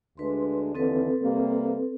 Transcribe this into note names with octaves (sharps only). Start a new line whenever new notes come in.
D2 G#3 D4 B4 C6
D#2 D3 E3 C4 A4 B4
C3 G3 A#3